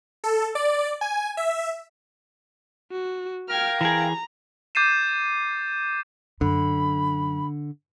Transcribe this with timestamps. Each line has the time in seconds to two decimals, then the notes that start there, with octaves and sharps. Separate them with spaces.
0.24 A4
0.55 D5
1.01 G#5
1.37 E5
2.92 F#4
3.49 A#4 F5 G5 F6 G#6
3.81 E3 G#4 A#5
4.75 D6 G6 A6 C7 D#7 E7
6.41 F#2 D3 B5